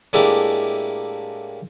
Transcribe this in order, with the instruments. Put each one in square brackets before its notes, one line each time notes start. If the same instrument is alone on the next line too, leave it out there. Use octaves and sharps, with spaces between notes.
[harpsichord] A2 G#3 A#3 D4 E4 G4